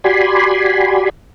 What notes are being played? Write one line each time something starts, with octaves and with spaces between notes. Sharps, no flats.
F#4 G4 D5 G#5 B5 C6